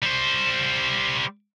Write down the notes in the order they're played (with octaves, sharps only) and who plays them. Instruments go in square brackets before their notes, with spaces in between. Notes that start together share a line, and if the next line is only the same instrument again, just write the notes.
[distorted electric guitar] G3 C5